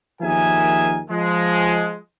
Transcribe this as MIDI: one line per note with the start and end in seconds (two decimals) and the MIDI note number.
0.21 1.00 39
0.21 1.00 53
0.21 1.00 68
0.21 1.00 70
0.21 1.00 76
0.21 1.00 80
1.09 1.97 53
1.09 1.97 56